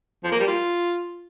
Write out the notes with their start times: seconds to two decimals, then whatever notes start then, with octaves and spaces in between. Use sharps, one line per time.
0.24 F3
0.32 A#3
0.40 G3
0.48 F4